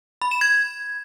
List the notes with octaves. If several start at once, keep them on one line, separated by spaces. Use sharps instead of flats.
B5
E7
G#6